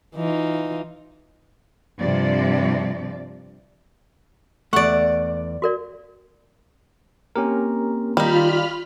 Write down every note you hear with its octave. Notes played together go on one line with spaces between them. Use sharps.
E3 D#4 F4
G2 C3 F3 D5
E2 A3 D5 F#5 C#6
F#4 A#4 D5
A#3 C4 C#4 G4 A#4
D#3 G3 D#4 F4 B5 F6